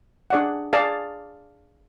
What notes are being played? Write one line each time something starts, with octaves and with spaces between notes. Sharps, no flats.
D4 G#4 D5 F#5
G#4 D5 F5 A5